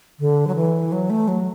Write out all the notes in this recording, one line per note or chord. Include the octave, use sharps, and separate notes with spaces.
D3
F#3
E3
F#3
A3
F#3